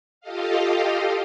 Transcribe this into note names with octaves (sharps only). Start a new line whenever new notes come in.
F4 G4 A4 D#5 F5